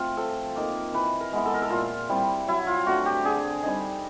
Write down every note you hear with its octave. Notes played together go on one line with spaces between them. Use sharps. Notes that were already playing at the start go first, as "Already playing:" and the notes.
Already playing: A3 C4 F4
F3 A4
A#3 D#4
E3 B4
A#4
G#3 B3 E4
A4
A#4
A4
A#2 F4
G3 C4 E4
F#3 E4
F4
A3 D4 F#4
G4
D3 G#4
G3 C4 D#4